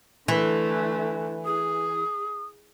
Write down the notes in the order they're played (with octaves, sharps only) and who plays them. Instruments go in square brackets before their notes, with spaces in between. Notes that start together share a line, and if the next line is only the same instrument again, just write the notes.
[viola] D3 A3 [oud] E3 [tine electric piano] B4 E5
[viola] G#4 [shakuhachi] D#6